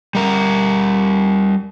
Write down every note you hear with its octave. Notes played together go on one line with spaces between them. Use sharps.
G3 A#4